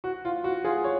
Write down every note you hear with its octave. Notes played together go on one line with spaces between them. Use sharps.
F#4
F4
F#4
F4 G#4
C#5